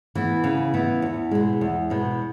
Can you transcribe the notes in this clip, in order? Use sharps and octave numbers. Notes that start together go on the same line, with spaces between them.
E3 B3
C#3
E3 B3
E2
B2 G#3
E2
B2 G#3